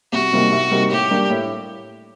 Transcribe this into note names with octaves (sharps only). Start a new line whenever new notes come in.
C2 F#4
C3 G3 A#3 D#4
C2
C3 G3 A#3 D#4
A2 G4
G3 A#3 D4
A2